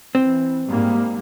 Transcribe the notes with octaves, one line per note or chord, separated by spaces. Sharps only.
E3 C4
G#2 G3 A#3